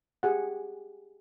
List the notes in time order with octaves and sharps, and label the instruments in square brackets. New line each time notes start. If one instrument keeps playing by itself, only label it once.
[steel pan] G4 G#4 F#5